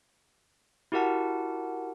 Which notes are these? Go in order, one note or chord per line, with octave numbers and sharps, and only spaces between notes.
E4 F#4 G4 A#4 F#5 A5